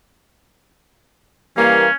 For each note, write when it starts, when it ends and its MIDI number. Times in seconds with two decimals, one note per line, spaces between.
1.57 1.86 52
1.57 1.86 55
1.57 1.86 58
1.57 1.95 61